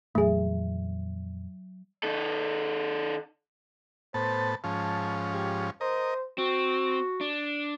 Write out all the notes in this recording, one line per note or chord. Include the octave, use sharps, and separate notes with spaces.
F2 A#2 E3 F#3 A3 G#4 E5
D#3 A4
A2 B3 C5 A5
G#2 F3 C#4 A5
G4
A#4 C5 D#5
C4 F#4
D4